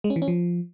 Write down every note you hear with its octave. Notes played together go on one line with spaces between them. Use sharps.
G#3
C#4
E3
C#4
F3